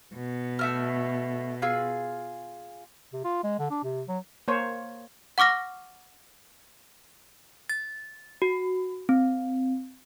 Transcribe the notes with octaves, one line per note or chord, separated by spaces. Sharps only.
B2
A3 E5 F6
F4 G#4 E6
C3
F4
G#3
D3
D4
C3
F#3
A#3 C5 C#5
F#5 C#6 D6 F6 A#6
A6
F#4
C4